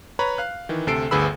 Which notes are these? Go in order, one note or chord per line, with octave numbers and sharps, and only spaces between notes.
B4 C#5 A#5 B5
F5 F#6
D#3 E3
D2 C3 A4 C7 D7
G1 D2 G#4 B4 B5 E6